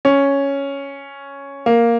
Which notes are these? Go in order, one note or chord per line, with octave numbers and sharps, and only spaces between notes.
C#4
A#3